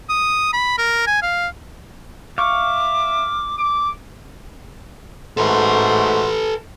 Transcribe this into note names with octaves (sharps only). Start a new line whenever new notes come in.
D#6
B5
A#4
G#5
F5
E5 F5 C#6 D6
D6
G#2 A3 F#4 A4 B4 C6